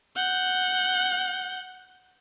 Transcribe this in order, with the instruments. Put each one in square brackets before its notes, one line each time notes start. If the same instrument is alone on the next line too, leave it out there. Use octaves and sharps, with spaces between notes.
[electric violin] F#5 G6